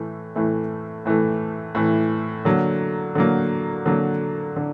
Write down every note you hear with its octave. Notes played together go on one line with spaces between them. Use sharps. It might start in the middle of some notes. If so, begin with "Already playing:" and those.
Already playing: A2 E3 A3
A2 E3 A3
A2 E3 A3
A2 E3 A3
D3 F#3 A#3
D3 F#3 A#3
D3 F#3 A#3
D3